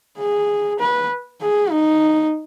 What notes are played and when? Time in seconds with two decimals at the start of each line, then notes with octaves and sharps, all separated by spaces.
0.18 G#4
0.80 B4
1.41 G#4
1.70 D#4